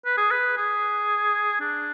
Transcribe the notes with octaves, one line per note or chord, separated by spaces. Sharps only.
B4
G#4
B4
G#4
D4